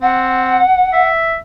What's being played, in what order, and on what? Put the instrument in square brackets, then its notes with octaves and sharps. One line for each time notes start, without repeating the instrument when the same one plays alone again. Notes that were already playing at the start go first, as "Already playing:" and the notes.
[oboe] C4 [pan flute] F#5
[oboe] E5